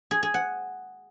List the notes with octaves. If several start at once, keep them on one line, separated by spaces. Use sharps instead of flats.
G#4
G#4
F#5